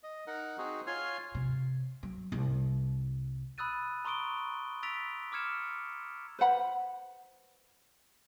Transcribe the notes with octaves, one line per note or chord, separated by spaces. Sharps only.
D#5
D#4 A#4 F#5
C4 D#4 F#4 G#4
F4 C#5 G#5 C6 F6
C3
F#3
C2
B5 D#6 E6 F#6 A6 D#7
A#5 C6 C#6 D#6 D7 G7
E6 A6 B6 D7 F7
D6 E6 F6 G#6 C#7 E7
B4 C5 F#5 B5